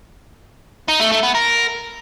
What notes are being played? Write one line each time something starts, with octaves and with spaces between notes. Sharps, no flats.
D#4
A3
A3
B3
A#4